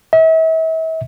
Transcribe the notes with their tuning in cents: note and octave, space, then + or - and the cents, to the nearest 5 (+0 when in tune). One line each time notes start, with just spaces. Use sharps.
E5 -40